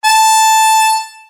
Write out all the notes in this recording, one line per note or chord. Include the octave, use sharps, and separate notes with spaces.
A5